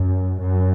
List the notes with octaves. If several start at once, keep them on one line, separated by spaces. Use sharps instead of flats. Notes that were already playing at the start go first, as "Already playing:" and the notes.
Already playing: F#2
F#2